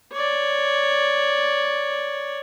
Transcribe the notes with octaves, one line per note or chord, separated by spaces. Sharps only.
C#5 D5